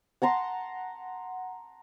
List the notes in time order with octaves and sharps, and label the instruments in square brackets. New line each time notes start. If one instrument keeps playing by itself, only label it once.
[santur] F#5 A5 A#5 C6